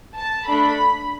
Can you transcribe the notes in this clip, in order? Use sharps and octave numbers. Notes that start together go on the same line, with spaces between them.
A5
A3 D4 A4 B5